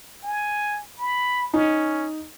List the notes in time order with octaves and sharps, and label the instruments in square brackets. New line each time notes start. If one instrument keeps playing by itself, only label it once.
[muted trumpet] G#5
B5
[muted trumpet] C#4 [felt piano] D#4